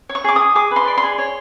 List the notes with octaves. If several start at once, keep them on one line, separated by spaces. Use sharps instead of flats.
C#5
C#6
G#4 D6
G#4 D#6
G#4 D6
B4
C6
D5
C6
G#4
C#5